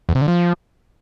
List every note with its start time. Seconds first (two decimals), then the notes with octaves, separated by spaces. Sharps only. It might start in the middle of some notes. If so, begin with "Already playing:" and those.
0.09 E2
0.15 C3
0.22 D3
0.28 F3